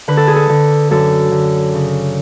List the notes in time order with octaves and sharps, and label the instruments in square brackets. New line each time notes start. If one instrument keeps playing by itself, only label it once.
[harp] D3 B4
A4
G#4
A4
D3
F#2 A4
D3
C#3